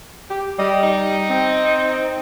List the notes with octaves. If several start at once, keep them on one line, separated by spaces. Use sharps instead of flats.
G4
G3 D#5
D#4
C4